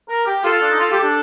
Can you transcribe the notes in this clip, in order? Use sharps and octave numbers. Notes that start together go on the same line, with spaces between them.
A#4
G4
F4 A4
D4
D#4
F4
G4
D4